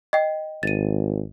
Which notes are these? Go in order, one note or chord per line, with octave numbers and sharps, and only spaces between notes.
D#5 G5
G#1 A6 D#7